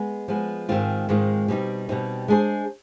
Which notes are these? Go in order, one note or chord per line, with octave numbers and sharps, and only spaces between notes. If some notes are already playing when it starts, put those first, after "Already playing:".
Already playing: G#3 B3
F3 G#3 B3
G#2 D#3 G#3 C4 F4
G#2 D#3 G#3 C4 F4
B2 G3 C4 D#4
B2 G3 C4 D#4
G#3 D4 G#4 C5